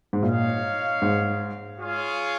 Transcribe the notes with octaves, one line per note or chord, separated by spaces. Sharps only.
G#2
A#2 D#4 C#5 F5
G#2
F4 G#4 C#5 F5